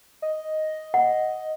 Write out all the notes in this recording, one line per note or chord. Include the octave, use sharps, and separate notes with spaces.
D#5
F#5